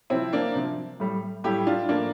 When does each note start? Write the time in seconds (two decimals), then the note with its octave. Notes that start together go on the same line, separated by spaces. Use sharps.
0.10 C3 F3 C4 E4
0.33 A#3 D4
0.55 C3 F3
1.00 A2 G3
1.44 A2 G3 E4 G4
1.67 D4 F4
1.89 A2 F3 A#3 D4